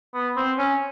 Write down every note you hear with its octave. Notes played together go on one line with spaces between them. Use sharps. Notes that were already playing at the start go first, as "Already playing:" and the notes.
B3
C4
C#4